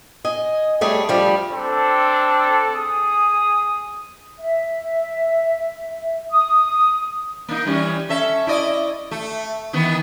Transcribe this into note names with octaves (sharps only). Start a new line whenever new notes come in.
D#5 G#5
G3 A3 G#4 C#5
F3 G3 D4
C4 D4 A4
G#4 D#6
E5
D#6
A#3 D#4
E3 G3 C#4
C#4 A4 E5
E4 D5 D#5
A3
D#3 E3 B3